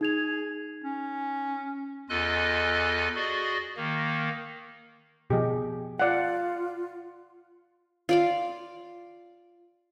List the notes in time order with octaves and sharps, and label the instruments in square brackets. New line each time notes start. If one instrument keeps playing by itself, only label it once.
[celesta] D#4 G#6 F7 [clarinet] G#4
[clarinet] C#4
[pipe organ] E2 F4 A4 D#5 G#5 F#6
F#4 G#4 D5 D#5
D#3 A#3
[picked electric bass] B2 F3 [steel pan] G4 G#4 D#5
[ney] F4 [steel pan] D5 F5 F#5
[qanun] F4 D5 F5